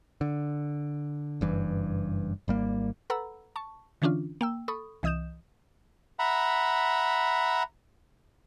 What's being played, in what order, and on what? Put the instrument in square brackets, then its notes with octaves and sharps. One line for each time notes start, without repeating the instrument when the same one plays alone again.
[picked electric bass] D3
F#1 G2 E3
G#1 G3 A#3
[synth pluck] A4 B4 F#5 A#5 B5 E6
A5 C#6
D3 E3 C#4 D4 F4
A#3 G5 E6
A4 B5 C#6 D#6
C2 E3 D#5 D#6 G6 E7
[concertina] E5 F#5 A#5 B5